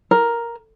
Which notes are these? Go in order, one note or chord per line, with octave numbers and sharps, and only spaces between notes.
A#4